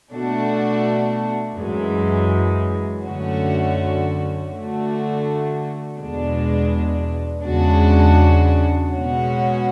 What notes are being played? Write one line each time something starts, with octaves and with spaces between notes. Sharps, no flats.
B2 A3 D4 F#4
F#2 E3 G#3
F#2 D3 A3 C#4 F#4
D3 A3 D4 F#4
E2 B2 G#3 D4
E2 C#3 G#3 D4 F#4
B2 G#3 C#4 F#4